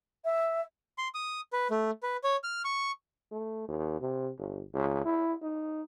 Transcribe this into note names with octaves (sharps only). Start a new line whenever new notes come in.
E5
C6
D#6
B4
A3
B4
C#5
F6
C#6
A3
D#2
C3
G1
C#2
E4
D#4